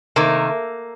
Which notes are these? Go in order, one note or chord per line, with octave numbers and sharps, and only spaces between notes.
C3 D#3 A3 A#3